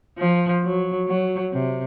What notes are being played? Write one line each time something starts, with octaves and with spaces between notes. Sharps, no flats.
F3
F#3
F#3
C3